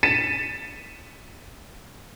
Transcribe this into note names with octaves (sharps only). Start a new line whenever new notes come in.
A6 B6 C#7 D#7 E7